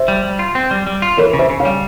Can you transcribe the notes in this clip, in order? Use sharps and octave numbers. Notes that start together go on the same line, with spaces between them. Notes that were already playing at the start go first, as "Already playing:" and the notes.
Already playing: C5 E5
G3
G3
F4
C4
G3
G3
F4
E3 A#4 C#5
C#3
C5 E5
C#3
C#5 F5
G3